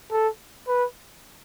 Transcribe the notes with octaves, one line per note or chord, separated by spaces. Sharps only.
A4
B4